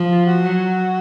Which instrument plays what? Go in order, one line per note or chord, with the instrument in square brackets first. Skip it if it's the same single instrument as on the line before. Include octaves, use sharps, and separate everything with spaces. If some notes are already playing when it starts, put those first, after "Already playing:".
Already playing: [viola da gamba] F3
[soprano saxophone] F4
F#4
[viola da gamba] F#3